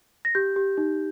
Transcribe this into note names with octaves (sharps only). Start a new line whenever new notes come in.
A#6
G4 G6
G4
D#4